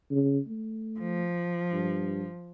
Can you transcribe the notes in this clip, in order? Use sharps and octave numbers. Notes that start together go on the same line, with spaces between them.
C#3
A3
F3
G2